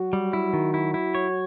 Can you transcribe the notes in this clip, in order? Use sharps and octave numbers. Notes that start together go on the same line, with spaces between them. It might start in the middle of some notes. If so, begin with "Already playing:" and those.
Already playing: F#3 F#4
G3
E4
D#3
E4
E4
C#5